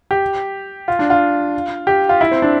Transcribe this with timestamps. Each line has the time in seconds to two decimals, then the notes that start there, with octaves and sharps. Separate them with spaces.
0.11 G4
0.88 F4
0.99 D4
1.10 F4
1.87 G4
2.09 F4
2.21 E4
2.31 C4
2.42 D4